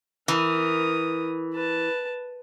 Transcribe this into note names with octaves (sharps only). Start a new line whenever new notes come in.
E3 A#4 D#6
B4 A5